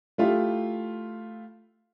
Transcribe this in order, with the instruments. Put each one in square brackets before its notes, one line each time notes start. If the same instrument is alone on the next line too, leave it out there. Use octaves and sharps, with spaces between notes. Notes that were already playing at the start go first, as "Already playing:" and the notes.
[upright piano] A3 E4 F4 G4